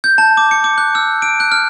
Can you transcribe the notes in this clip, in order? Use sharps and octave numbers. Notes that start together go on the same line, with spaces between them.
G6
A5
D6
C#7
D6
F#6
E6
D7
F#6
F6